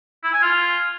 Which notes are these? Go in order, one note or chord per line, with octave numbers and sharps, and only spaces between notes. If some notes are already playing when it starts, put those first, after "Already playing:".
E4
G#5
F4